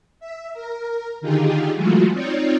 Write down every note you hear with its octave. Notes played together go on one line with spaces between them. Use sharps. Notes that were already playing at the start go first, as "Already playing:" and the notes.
E5
A#4
D3 D#3 D#4 F4 G4 G#4
E3 F#3 G#3 A3 F4 F#4
C4 D#4 F4 C#5 D5